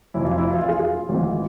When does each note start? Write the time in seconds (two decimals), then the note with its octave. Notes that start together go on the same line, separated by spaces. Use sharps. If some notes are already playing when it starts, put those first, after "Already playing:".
0.14 F1 F2 E3 E4
0.25 F4
0.38 E4
0.50 F4
0.62 F4
0.68 G#4
0.76 F4
1.09 G#1 G#2 E3